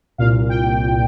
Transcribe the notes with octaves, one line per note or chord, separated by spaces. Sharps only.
C2 A#2 F5
G5